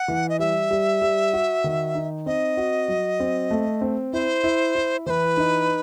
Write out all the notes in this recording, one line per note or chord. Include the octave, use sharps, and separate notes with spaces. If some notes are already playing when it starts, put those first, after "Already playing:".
Already playing: F#5
E3
D#5
G3 E5
G3
G3
F#4
D#3
D#4
C4 D#5
F#4
F#3
C4
A3
C4
E4 C5
E4
E4
E3 B4 C5
D#4